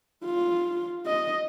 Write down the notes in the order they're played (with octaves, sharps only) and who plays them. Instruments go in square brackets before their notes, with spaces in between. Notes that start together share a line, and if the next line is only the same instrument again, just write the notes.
[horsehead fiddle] F4
D#5